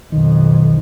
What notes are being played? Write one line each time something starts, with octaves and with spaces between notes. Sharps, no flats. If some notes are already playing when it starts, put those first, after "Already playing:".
B1 F2 D#3